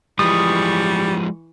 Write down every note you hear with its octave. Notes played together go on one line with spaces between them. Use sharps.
E3 F3 G3 G#3 C#6 D#6